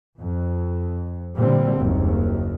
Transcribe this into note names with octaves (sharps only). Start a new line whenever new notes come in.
F2
A#2 D3 G3 C4
F#1 D#2